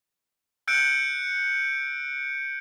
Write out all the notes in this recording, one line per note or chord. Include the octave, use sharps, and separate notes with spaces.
E6 F#6 G6 C#7 D7